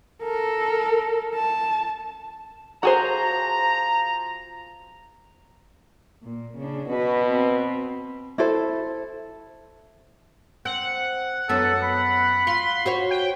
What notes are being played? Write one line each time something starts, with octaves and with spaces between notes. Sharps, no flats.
A4 A#4
A5
F3 F4 F#4 G#4 C5 A#5
A#2
C#3 D4
B2 F#4 B4
C4 B4
E4 A4 C5
C4 F#5
F#2 B3 A4
B5
F4 C6
F#4 C5 C#5
G5